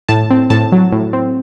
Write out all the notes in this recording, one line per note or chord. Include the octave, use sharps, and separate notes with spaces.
A2 A5
C4
A2 A5
F#3
A2
C4